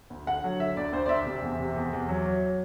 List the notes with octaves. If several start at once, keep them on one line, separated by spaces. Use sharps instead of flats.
D2
D3 F#5
F#3
D3 E5
D2 D5
D2 C5
D5
D2 E5
C3
E2
C3
E2
E2
F#3
F#3